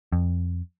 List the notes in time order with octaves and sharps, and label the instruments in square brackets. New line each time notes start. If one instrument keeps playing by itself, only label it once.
[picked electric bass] F2